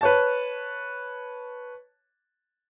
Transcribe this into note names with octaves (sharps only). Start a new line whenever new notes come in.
B4 C#5 A5